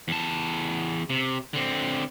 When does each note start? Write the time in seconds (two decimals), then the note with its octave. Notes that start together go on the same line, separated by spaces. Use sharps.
0.08 E2 A5
1.10 C3
1.54 D3 C4